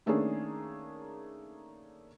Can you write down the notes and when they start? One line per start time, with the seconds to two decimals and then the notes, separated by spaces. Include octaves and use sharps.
0.06 D#3 A3 A#3 C#4 D4 G#4